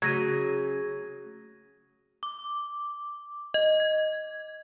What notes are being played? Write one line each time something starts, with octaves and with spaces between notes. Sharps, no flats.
C#3 F#3 A3 F#4 G#6 A#6 D#7
D6
D#5
G#6